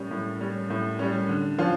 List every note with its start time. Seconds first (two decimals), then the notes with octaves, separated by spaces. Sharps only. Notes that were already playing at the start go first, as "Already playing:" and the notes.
Already playing: A2 G3 C#4
0.11 A2
0.41 G3 C#4
0.70 A2
0.99 G3 C#4
1.29 D3
1.58 F3 C#4 F4